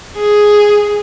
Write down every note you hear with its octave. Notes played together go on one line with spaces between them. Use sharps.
G#4